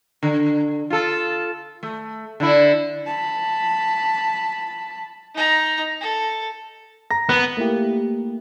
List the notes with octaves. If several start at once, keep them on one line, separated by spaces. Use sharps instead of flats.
D3
F4 A4
A3
D3 E4
A5 B5
D#4 A#5
A4
A#5 A#6
B3 F#6
A3 A#3 E4 G4